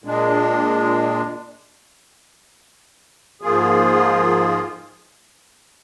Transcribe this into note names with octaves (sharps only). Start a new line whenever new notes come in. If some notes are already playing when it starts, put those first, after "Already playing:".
A#2 G#3 D4
G#2 F3 A#3 F4 G#4